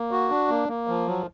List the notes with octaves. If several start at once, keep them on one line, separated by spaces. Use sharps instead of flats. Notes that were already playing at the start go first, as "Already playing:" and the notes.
Already playing: A#3
F#4
D4
A#3
A#3
F3
F#3